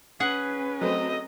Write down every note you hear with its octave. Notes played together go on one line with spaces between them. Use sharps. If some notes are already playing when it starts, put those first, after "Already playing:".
C#4 G#4 B4 F#5
F#3 A3 C4 D#5